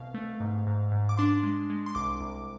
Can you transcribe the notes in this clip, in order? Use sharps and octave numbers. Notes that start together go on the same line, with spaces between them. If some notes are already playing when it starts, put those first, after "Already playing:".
Already playing: C2 B2 F5
A3
G#2
G#2
G#2
D6
D4 C6
G#3
G#3
C6
C2 D6
C2